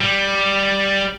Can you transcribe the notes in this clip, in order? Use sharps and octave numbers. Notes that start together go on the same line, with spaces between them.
G3